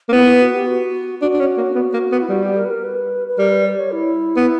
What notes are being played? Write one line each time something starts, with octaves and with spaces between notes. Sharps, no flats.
A#3
B3 E4
E4
F#4
G4
F#4
D4 F#4
D4
C#4
A#3
B3
A#3
B3
E4
G3 F#4
G4
A#4
B4
A#4
B4
B4
G3 A#4
B4
D5
C#5
E4
B3